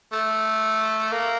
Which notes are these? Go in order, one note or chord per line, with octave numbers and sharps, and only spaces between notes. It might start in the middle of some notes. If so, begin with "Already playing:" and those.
A3
A#3